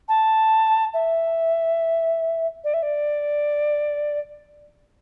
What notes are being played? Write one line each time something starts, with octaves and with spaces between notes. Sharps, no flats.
A5
E5
D5
E5
D5